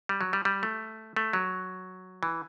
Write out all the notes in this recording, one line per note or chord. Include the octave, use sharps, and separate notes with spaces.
G3
F#3
G3
G3
A3
A3
F#3
E3